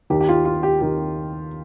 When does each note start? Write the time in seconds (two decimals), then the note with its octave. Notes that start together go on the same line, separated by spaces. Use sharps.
0.10 D#2 D#3 G4
0.20 G4
0.29 F4
0.45 F4
0.63 G4
0.80 D#2 D#3 G4